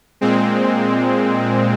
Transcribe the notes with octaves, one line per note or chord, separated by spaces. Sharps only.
A#2 G#3 C4